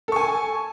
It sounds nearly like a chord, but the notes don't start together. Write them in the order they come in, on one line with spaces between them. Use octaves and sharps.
A4 C#6 G#5